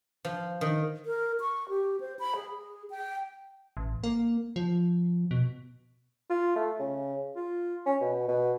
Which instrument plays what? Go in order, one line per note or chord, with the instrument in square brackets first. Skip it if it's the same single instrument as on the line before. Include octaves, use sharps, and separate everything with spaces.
[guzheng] F3
D#3
[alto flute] A#4
C#6
G4
C5
B5
G#4
G5
[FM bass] A1
A#3
F3
B2
[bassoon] F4
A3
C#3
F4
C#4
B2
B2